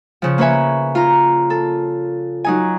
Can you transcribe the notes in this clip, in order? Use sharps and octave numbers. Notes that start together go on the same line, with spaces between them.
C#3 F3
A#3 C#4 B4 C#5 E5 G#5
F4 A#5
A4
F#3 D#4 G#5